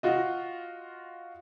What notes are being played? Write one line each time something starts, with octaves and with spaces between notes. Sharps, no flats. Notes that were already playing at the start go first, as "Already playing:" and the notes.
F4 F#4 D#5